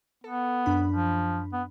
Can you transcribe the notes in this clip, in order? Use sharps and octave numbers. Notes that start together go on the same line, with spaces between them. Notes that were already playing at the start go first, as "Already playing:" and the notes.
B3 A4
F#2 D4 B5
F3
B3